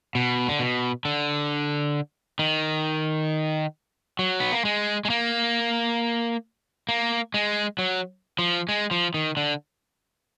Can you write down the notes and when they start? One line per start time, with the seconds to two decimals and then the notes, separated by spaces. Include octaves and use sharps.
0.15 B2
0.49 D3
0.59 B2
1.05 D3
2.39 D#3
4.19 F#3
4.40 B3
4.52 A#3
4.65 G#3
5.05 G#3
5.10 A#3
6.89 A#3
7.34 G#3
7.78 F#3
8.39 F3
8.69 G#3
8.91 F3
9.14 D#3
9.37 D3